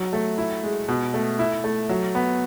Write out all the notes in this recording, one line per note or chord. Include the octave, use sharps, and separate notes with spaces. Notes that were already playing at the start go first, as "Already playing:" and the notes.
Already playing: F#3
A3
E4
G#3
B2
A3
E4
A3
F#3
B3